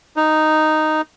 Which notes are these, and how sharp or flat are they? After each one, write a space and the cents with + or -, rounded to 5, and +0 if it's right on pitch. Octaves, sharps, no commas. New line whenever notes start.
D#4 -5